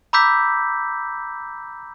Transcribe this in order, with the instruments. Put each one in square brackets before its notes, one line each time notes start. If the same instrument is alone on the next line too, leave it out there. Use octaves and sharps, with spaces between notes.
[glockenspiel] A#5 B5 D6 E6 G6 B6